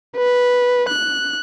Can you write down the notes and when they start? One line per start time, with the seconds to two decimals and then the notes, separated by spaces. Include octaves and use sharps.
0.17 B4
0.89 F#6